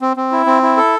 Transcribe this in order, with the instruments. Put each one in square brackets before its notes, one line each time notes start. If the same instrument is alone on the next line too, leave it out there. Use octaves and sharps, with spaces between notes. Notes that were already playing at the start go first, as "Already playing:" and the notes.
[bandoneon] C4
C4
E4
C4
E4
A4